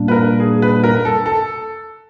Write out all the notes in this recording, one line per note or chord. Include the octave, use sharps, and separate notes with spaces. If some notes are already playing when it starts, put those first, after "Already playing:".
Already playing: A#2 G3 A#3 D4
B4
A#4
G#4
B4
A#4
A4
A4